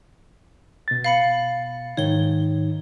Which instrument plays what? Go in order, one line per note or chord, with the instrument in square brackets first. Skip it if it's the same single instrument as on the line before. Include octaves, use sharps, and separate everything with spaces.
[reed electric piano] B2 A6
[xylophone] F5 B5 C#7
[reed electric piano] G#2 D#3 D#4 [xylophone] C#5 G7